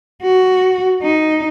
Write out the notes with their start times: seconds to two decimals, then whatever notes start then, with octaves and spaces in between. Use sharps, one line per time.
0.22 F#4
1.02 D#4